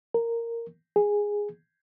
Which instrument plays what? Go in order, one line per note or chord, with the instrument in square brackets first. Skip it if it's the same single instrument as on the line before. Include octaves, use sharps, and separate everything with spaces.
[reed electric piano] A#4
G#4